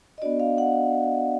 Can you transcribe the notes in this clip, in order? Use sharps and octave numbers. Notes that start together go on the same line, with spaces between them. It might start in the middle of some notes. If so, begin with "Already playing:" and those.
D#5
B3 D4 F#4 D5
F5
F#5